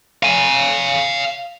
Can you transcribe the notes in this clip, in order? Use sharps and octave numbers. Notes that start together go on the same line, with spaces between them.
F5 G#5